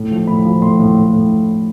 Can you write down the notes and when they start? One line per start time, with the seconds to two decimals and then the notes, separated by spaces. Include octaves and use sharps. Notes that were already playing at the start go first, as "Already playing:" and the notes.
Already playing: A2
0.11 F3
0.27 A2 B5
0.45 F3
0.62 A2 C6
0.80 A2
0.96 A2
1.13 A2